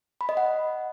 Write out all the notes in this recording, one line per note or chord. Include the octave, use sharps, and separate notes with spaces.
B5
D#5
F#5